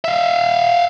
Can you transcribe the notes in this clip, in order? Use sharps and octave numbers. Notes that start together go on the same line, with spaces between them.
E5 F5